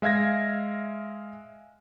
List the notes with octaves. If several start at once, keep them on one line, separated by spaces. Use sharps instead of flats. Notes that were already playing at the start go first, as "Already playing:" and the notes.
G#3 E5 F5 G#6 A#6